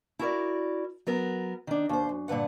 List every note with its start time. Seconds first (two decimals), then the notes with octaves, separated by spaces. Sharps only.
0.19 E4 F#4 A#4 D5
1.07 F#3 B3 A#4
1.67 D#3 D4
1.89 D#2 C5
2.09 F#2
2.28 G2 A#2 D3 B4 F#5